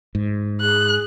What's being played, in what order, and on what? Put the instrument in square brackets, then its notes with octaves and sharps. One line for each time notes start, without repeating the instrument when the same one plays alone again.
[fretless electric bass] G#2
[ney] G#4 [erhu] F#6